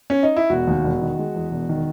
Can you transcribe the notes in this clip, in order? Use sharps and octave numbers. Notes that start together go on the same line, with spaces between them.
C#4
D#4
E4
E1 F#4
D#2
E1
D#3
G#3
E2
E1
D#3